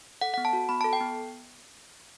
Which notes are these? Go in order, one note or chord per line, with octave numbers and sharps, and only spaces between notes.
A4 F#5
F#5
B3
A5
F#4
B3 B5
A5
A4
G5
B3